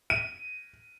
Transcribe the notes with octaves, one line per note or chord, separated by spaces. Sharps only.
D#7